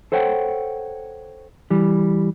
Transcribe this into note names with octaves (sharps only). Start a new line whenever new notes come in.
A4 C5 C#5 F#5 G5
E3 G3